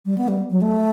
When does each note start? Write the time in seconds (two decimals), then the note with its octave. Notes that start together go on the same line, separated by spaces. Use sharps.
0.06 G3
0.18 B3
0.28 G3
0.50 F#3
0.62 A3